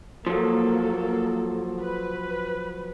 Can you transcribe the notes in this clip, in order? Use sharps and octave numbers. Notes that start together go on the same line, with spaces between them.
F3 F#3 A#3 A4
B4